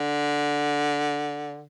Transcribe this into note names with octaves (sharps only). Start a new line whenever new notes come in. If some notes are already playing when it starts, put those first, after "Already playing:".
Already playing: D3